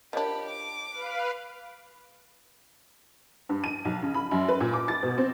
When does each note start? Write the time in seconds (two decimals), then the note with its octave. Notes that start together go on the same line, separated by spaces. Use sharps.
0.13 F3 D4 G4 A#4 C#5 D#5 B5
0.49 D6
0.91 B4 F5
3.49 G2
3.64 D#7
3.85 B1
4.03 C#3
4.14 B5
4.31 F#2
4.48 B4
4.60 A#2
4.73 D6
4.88 A6
5.03 B2
5.18 C4